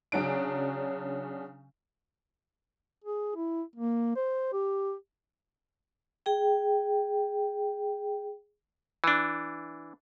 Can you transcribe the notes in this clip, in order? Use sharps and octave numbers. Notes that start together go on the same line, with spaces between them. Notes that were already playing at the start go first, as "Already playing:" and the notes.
C#3 F#3 C#4 D4 D7
G#4
E4
A#3
C5
G4
G#4 G5
E3 D4